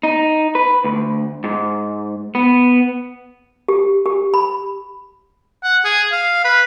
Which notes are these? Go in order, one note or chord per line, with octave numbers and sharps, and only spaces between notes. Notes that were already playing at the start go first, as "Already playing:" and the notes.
D#4
B4
D2
G#2
B3
G4
G4
B5
F#5
G#4
F5
B4